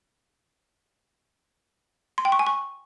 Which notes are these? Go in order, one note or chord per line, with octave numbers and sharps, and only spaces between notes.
C6
G5
C#6
G#5
C#6